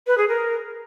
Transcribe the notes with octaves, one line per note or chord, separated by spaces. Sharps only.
B4
G#4
A#4